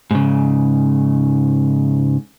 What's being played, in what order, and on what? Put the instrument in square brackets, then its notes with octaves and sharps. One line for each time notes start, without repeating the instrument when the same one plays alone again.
[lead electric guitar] G#2 C#3